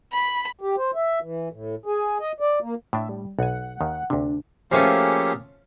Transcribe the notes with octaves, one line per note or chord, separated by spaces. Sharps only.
B5
G4
C5
E5
E3
A2
G#4
D#5
D5
A#3
A2 D4 E5
G3
B1 F#5 G#5
D#2 D#3
D2 C3 D4
F3 A3 A#3 C#4 G4 G#4